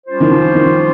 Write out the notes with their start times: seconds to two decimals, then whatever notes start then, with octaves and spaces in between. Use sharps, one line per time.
0.06 G3 C#4 F4 C5
0.20 D#3
0.31 F3
0.54 D#3